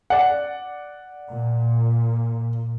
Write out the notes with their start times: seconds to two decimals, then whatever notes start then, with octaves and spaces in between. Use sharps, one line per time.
0.10 D5 F#5
1.30 A#2